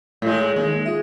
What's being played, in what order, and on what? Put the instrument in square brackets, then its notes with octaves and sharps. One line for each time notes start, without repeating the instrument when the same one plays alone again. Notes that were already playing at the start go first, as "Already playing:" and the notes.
[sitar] A2 G#3 [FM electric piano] A3 E4
[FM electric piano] D#3 A#3 D#4 [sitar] G#3
[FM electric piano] F4 E5